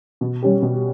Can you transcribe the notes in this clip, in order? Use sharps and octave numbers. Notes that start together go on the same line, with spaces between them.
B2
G3 C#4 G4
B2